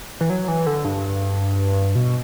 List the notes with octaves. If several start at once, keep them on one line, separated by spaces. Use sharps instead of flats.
E3
F#3
E3
D3
G2
B2